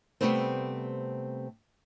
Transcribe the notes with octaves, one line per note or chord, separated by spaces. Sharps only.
C3 E3 G3 A3 B3 C4